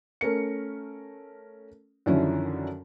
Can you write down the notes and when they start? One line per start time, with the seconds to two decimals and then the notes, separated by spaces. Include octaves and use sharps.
0.21 A3 C#4 A#4 C#7
2.06 F#2 D3 D#3 F3 C#4 E4